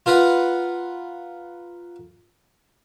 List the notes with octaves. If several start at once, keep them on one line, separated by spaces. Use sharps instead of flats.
F4 A#4 B4 F#5